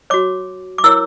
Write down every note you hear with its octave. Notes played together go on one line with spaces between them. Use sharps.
F#4 C#5 D6
D6
E4 A#4 C#5 E6